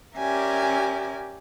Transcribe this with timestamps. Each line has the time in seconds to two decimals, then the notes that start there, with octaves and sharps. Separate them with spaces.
0.18 C#4 G4 A#4 D5 E5 G#5